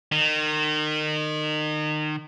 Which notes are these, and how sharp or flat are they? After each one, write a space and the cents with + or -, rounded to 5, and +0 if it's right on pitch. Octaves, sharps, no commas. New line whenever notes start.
D#3 -30